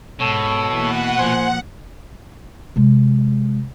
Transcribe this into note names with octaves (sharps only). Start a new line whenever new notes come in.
G#2 B2 A4 C#5
E3 A#3 F#5
A#2 F3 C5 G#5 C6
C3 G#3